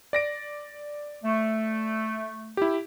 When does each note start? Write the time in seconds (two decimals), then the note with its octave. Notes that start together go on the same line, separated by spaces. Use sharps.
0.13 D5 A#6 D7
1.22 A3
2.57 E4 G4